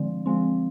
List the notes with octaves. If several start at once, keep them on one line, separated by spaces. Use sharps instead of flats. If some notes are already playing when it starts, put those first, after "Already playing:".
Already playing: D3 F3 G#3 C4
F3 G#3 C4